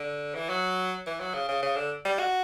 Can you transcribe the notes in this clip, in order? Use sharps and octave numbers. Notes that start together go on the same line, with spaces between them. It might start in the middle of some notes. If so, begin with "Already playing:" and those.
Already playing: D3
E3
F#3
E3
F#3
C#3
C#3
C#3
D3
G3
F#4